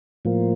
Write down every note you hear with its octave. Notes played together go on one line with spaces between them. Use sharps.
A2 F3 A#3